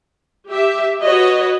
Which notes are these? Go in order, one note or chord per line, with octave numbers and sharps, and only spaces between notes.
G4 E5
F#4 B4 C#5 D#5